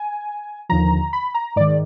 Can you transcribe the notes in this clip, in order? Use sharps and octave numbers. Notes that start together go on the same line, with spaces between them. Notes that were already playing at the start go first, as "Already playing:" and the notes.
Already playing: G#5
D#2 D3 F3 A#5
B5
A#5
G#2 D#3 D5